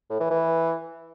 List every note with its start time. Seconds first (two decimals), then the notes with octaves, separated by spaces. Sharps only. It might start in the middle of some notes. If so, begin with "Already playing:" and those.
0.10 A2
0.20 E3
0.30 E3